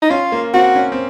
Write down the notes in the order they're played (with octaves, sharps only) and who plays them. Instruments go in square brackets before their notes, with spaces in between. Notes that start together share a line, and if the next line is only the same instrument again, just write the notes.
[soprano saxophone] D#4
[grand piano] C#4 [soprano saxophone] F4
[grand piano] A#3
[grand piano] C4 [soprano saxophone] F#4
[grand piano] C#4
C4